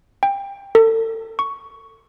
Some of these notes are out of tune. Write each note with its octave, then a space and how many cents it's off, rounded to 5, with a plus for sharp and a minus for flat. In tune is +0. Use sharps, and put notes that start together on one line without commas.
G5 +20
A4 +35
C#6 +10